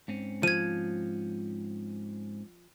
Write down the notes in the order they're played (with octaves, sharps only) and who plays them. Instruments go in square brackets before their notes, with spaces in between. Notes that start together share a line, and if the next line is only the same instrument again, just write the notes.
[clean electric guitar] G#2 C4 C#4
[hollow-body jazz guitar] F3 [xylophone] G#6 D#7